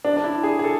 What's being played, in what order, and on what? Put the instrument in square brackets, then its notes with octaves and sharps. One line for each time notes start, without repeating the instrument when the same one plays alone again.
[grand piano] D4
D4
E4
G#4
G#4
A4